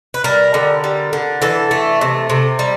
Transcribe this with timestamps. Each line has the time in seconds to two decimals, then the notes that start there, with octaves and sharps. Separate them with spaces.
0.14 B4
0.24 G3 A#4
0.54 D3
0.84 G3
1.13 D3
1.42 E3 A4
1.71 A3
2.01 C3
2.30 C3
2.59 G3